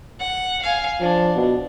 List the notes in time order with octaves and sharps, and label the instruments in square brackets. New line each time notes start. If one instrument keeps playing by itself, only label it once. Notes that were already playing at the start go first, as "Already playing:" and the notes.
[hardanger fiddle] F#5
F5 G#5
[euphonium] F3 [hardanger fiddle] D4
[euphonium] B2